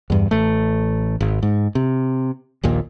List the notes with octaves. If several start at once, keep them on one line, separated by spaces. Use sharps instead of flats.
E2 G2
A1 A3
G#1
G#2
C3
A#1 D#2 A#2